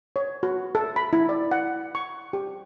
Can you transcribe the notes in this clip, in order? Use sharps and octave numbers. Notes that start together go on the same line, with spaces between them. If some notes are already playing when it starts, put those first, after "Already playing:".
C#5
F#4
A4
B5
E4
D5
F#5
C#6
G4